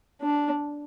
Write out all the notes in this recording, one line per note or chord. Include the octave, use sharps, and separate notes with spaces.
D4